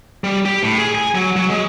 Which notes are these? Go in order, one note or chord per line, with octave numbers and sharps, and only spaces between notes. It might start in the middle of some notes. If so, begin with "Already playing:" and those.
G3
G4
A2
G#4
G#5
F#3
F#3
G#3